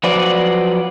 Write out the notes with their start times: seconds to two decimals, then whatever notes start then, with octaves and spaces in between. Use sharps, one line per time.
0.03 F3 F#3 F#4 B4 C5 D5